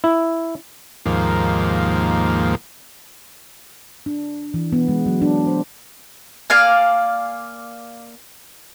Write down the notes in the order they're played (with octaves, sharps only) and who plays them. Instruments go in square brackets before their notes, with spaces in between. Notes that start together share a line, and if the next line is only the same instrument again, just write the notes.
[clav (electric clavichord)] E4
[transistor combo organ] D#2 G#2 F3 A#3
[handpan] D4
E3
B3
G#3
F#3
D4
C5
[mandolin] A#3 D5 F5 G#5